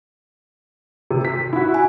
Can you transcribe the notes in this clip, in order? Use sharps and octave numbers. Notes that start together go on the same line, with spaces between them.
C3
B6
E4 F#4
G#5